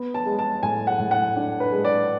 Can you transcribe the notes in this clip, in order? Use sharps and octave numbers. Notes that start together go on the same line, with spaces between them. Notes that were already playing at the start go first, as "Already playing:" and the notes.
Already playing: B3
A5
G#3
A5
A2 G#5
F#5
A2
F#5
D4
B4
G#3
D5